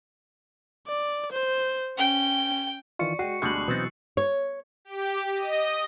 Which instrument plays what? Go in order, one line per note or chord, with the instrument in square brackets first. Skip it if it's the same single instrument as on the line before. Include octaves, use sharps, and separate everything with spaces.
[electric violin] D5
C5
[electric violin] C#4 [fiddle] G5
[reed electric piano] D#3 E3 F4 [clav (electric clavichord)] D5 [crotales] C#6 C#7
[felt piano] G#3 G5 D#7 [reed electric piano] F#4 [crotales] C7
[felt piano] D2 D4 G6 [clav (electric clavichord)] B2 G3 G#3 [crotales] F#6 F#7
[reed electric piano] B2 E6 A6 [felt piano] E3 F#3 [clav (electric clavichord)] B3 C4 D#4
[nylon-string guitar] C#5
[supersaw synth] G4
D#5